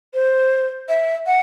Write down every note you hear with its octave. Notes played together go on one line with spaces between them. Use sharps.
C5
E5
F#5